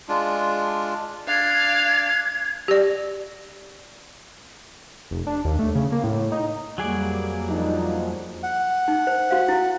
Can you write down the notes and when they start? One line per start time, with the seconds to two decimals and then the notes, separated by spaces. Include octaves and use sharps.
0.09 G#3 D4 F4
1.28 D4 F5 G#6
2.68 G4 D5
5.11 F1
5.27 D4
5.45 D#2
5.59 A3
5.75 C#3
5.92 A#3
6.04 A2
6.32 D#4
6.78 F2 F#3 G3 A#3 G#4 D5
7.49 F3 D4 D#4
8.43 F#5
8.88 D#4
9.07 C5
9.31 F#4 F5
9.48 E4